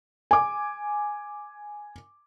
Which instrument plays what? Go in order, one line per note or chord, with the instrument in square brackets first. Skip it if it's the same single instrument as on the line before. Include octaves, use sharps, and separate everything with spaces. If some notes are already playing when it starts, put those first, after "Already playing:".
[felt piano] G#5 D6